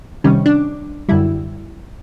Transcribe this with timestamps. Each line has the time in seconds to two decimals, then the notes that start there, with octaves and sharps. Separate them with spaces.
0.24 C3 D#3 G3 C#4
0.46 D4
1.09 F#2 D3 G3 E4